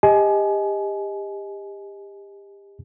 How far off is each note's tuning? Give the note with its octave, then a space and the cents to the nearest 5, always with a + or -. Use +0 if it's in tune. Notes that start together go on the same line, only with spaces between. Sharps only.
G4 +30 D#5 +10 G#5 +30